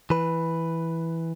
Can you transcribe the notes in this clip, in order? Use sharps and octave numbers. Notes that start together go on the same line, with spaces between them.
E3 B4